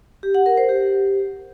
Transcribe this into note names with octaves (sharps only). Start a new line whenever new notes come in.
G4
F#5
A#4
C5
G4